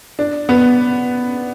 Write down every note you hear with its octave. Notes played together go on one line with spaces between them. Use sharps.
D4
B3